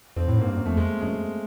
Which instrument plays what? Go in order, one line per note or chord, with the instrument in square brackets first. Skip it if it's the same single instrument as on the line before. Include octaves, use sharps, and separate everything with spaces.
[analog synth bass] F2 [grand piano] C4
[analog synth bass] A2
[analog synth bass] G#2 [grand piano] A#3
[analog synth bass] G2
F#2
[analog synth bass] F2 [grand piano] A3
[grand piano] G#3
[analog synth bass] F#2 [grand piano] G#3